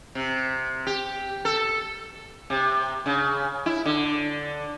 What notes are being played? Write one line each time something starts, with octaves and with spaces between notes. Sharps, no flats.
C3
G4
A4
C3
C#3
E4
D3